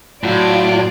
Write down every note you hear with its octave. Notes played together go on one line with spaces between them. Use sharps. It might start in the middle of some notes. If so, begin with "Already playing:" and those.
A2 F#3 F4 D5